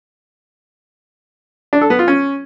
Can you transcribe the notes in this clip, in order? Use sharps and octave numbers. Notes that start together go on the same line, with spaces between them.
D4
A4
B3
F4
C#4